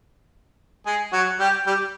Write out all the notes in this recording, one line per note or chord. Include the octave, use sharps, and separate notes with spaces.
G#3 G#4
F#3 F#4
G3 G4
G3 G4